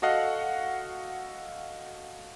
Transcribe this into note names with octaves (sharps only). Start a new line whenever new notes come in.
F#4 A4 D#5 F5 F#5